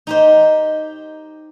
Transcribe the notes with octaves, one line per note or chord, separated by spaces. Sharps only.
D#4 G4 C5